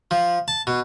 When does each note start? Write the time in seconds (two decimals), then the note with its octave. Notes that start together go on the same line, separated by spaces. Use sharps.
0.11 F3
0.48 A5
0.67 B2